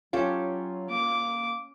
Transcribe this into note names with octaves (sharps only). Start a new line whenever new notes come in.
F#3 C#4 F4 G4 A4
A#3 D6